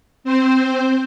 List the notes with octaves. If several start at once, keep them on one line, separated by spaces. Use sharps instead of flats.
C4 C5